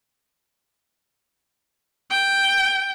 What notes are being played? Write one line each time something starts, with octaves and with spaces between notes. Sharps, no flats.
G5